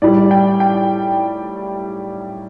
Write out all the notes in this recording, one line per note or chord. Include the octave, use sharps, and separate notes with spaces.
A2 G3 D5
G5
G5